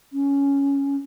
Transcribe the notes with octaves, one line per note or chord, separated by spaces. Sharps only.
C#4